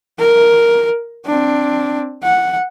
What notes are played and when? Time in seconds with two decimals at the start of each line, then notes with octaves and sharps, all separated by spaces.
0.19 A#4
1.26 C4 D4
2.24 F#5